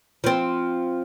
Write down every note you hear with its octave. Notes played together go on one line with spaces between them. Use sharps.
F3 C4